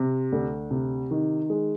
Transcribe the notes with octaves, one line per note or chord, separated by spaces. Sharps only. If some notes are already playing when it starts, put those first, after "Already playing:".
Already playing: C3
D2
C3
D#3
G#3